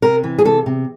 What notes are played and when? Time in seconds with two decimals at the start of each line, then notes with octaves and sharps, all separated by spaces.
0.02 C3 A#4
0.24 E3
0.38 G#4
0.45 C3 A4
0.66 C3